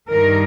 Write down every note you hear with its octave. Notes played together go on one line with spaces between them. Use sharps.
G2 D#3 A#4